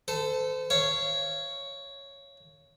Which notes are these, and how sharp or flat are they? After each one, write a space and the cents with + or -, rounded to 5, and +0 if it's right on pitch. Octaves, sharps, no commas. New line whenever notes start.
A4 +0 C5 -35
C#5 +0 F5 -25